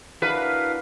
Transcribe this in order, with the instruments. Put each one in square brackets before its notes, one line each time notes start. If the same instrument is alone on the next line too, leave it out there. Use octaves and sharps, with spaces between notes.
[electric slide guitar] D4 E4 F#4 [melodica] A#4 F5 [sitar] B4